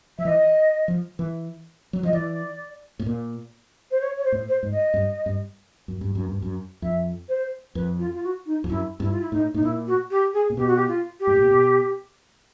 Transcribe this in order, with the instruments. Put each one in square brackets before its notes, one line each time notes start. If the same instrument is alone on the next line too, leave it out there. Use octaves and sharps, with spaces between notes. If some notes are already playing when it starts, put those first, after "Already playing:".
[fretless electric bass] F3 [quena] E5
[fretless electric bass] E3 [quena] D#5
[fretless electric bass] F3
E3
F#3
[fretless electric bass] F3 [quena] D#5
[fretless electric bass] E3 [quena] D5
[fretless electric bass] A2
A#2
[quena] C5
C#5
C#5
C5
[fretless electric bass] A2
[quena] C5
[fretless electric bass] G#2
[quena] D#5
[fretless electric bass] G2
G2
F#2
G2
F#2
G2
F#2
[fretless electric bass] F2 [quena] E5
[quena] C5
[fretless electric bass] F2 [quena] B4
[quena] F4
F4
F#4
D#4
[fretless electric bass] F2
[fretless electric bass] F#2 [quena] E4
[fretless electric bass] G2 [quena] E4
[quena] F4
E4
[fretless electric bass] A2 [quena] D#4
[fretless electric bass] A2 [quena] D#4
[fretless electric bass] A#2 [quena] E4
[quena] F#4
G4
G#4
[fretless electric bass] A#2
[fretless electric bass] B2 [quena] G4
[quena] F#4
G4
F4
G4
[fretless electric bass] G#2
A2
A#2
B2